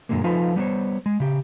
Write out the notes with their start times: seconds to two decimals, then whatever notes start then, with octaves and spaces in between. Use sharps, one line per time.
0.09 F#2 A#2 D3 G#3 A#3
0.24 F3 D#4 F4 A4 B4 F5
0.56 G3 B3 D#4 C5 C#5
1.06 G#3
1.20 C#3 G4